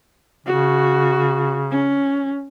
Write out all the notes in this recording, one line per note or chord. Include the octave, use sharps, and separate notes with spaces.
C#3 F#4
C#4